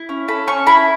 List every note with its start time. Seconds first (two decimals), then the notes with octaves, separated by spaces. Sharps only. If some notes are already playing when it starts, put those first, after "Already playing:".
Already playing: E4
0.09 C#4
0.28 A4 B5
0.47 C#4 C#6
0.67 E4 B5